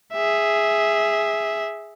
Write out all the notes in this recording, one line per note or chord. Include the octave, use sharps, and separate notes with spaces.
G#4 E5